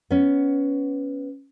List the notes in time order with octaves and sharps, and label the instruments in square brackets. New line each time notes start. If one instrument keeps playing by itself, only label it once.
[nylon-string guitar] B3 C#4